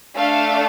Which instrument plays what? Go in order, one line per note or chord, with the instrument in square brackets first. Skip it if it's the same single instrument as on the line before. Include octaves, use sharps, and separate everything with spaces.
[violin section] A3 D4 A4 F5